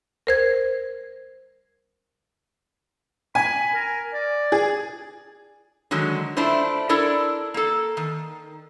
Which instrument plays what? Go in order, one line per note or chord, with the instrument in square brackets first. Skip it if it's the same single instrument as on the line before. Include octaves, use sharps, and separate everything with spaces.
[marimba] A#4 C5 G#6
[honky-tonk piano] G#5 [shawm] B5
[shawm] A#4
D5
[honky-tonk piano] G#4
[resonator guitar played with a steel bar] D3 D#3 F#3 G#3
A3 D4 E4 F4 C5
D4 E4 A4 A#4 D5
A#3 A4
D#3